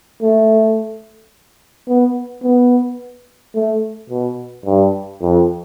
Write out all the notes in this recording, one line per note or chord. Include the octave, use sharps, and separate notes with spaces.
A3
B3
B3
A3
B2
G2
F2